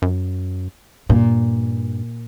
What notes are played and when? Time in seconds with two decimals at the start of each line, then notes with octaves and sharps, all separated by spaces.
0.02 F#2
1.09 G2 A#2